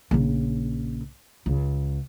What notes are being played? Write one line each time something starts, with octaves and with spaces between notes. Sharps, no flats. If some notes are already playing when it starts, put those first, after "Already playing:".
A#1 C#3
C#2